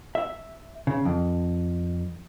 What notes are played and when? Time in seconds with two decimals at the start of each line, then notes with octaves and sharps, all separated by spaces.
0.15 E5
0.87 C#3
1.05 F2